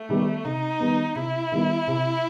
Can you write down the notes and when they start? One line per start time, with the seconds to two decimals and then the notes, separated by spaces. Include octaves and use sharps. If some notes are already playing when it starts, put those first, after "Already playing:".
Already playing: A3
0.09 D#3 G3 B3
0.44 C3 D#4
0.80 D#3 G3 B3
1.15 C3 E4
1.52 D#3 G3 B3
1.87 C3